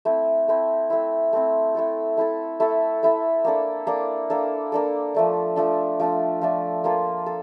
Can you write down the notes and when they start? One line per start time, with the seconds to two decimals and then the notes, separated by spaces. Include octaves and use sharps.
0.05 A3 C4 E4
0.48 A3 C4 E4
0.90 A3 C4 E4
1.33 A3 C4 E4
1.75 A3 E4 A4
2.17 A3 E4 A4
2.60 A3 E4 A4
3.03 A3 E4 A4
3.45 A#3 D4 A4
3.87 A#3 D4 A4
4.30 A#3 D4 A4
4.72 A#3 D4 A4
5.14 F3 A3 D4
5.56 F3 A3 D4
6.00 F3 A3 D4
6.41 F3 A3 D4
6.84 F3 A#3 F4 A4
7.26 A4